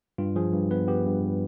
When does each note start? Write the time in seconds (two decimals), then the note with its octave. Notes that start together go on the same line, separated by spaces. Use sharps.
0.18 G2 F4
0.36 F3 G#4
0.53 G2
0.71 B3 B4
0.88 B3 G4
1.06 G2